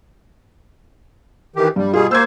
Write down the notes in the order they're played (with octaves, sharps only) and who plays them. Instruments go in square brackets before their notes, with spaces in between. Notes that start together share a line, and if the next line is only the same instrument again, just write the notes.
[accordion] D#3 E3 G4
[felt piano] G2 [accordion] G3
[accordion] B2 G3 G#4 [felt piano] F4
[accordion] A#3 C5 [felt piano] E6 G#6